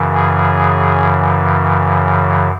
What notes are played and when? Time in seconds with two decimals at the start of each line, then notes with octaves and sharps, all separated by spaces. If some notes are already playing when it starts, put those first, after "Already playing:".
Already playing: F#2 C#3 E3
0.14 G#4